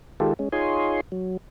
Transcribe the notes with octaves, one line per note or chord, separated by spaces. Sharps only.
D#3 G#3 F4 G4 A4
G#3 C#4
D#4 F4 G#4 C#5 G#5 C6
F#3